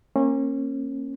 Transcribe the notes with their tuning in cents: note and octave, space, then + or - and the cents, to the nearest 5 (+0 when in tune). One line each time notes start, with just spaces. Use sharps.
A#3 -10 C#4 -30